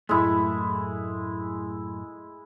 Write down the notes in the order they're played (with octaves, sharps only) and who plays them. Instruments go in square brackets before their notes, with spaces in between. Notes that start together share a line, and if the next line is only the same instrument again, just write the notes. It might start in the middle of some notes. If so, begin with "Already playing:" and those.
[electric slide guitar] F#2 A2 A3 [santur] G#3 E4